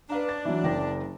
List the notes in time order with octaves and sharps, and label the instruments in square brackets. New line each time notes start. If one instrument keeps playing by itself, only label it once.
[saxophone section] D4 [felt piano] B4 F5 A#5
[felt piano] A6
E3 F#3
F#1 G5 A#6